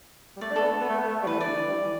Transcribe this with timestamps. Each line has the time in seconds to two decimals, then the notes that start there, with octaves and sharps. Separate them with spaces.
0.36 G3
0.41 A3 D5
0.50 D4
0.56 B3 A4
0.70 A3
0.80 B3
0.89 A3
0.98 B3
1.08 A3
1.23 G3
1.27 E3 B4
1.40 D5
1.46 D3
1.55 E3
1.69 G3
1.84 E3